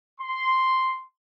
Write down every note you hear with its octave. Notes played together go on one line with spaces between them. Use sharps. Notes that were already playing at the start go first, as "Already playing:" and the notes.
C6